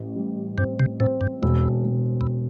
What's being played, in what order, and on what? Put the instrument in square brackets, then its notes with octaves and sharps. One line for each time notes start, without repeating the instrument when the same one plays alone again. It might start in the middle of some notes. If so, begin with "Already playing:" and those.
Already playing: [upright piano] A1
G3
[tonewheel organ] G2 [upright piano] C4
[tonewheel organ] C3
[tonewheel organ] A2 [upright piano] C4
[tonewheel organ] G2
[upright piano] E1 [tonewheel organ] E2
[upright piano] E1
[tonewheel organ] E2